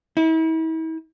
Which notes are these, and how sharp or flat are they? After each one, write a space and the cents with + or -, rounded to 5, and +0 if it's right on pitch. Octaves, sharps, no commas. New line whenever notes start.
E4 -40